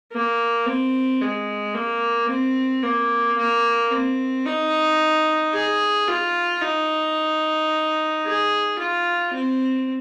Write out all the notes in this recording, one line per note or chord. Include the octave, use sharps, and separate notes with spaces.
A#3
C4
G#3
A#3
C4
A#3
A#3
C4
D#4
G#4
F4
D#4
G#4
F4
C4